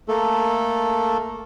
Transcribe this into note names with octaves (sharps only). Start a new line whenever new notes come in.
A3 A#3 A4